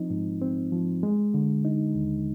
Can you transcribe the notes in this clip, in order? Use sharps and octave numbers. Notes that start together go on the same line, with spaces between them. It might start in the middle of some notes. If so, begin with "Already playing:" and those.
Already playing: F3 C4 D#4
G#2
C4
F3
G#3
D3
D#4
D#2